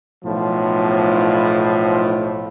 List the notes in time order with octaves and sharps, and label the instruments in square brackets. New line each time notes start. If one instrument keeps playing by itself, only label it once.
[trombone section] B1 A2 F3